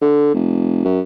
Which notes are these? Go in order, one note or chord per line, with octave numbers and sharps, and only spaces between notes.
D3
F1
F#2